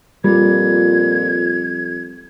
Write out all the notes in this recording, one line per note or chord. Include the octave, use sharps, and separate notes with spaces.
F2 A#2 G3 G#6